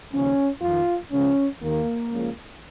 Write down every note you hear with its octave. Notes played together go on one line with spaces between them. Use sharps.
D#2 C#3 F3 C#4
F2 D#3 F4
C#2 C#3 F3 C#4
D#2 D#3 A#3
C#2 C#3 F3